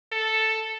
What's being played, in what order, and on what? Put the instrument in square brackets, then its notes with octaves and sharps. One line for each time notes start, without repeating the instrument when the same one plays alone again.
[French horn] A4